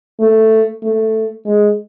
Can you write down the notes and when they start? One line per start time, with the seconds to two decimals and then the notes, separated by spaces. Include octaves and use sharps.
0.20 A3
0.83 A3
1.46 G#3